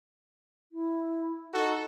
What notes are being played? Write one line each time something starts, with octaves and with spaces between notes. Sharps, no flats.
E4
D#4 F#4 A4